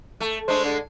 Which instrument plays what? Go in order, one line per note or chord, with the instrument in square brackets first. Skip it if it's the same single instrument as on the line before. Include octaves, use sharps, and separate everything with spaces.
[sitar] A3
[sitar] G#3 A3 D4 [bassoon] C5
[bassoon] D3